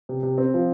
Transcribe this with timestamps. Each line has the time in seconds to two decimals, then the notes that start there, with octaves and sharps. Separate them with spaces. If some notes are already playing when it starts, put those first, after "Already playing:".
0.09 C3
0.23 C3
0.38 C4
0.54 F3